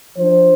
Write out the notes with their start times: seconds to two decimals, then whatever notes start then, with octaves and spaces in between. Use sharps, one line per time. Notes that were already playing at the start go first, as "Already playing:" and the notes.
0.18 F3 D4 C5